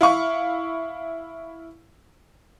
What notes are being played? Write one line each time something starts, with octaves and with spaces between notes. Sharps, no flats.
E4 F5 C#6